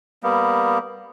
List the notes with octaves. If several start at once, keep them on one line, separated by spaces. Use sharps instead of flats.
G3 A#3 B3